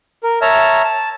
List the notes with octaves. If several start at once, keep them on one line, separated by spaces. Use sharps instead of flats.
A#4
C#5 E5 A5 A#5 F6
A5